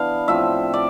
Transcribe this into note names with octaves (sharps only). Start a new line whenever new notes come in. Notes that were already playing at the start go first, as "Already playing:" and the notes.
Already playing: E3 B3 D4 F5
A2 F3 C4 E5
D5